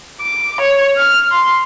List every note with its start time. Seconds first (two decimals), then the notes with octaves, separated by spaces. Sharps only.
0.21 D6
0.61 C#5
0.97 F6
1.31 C6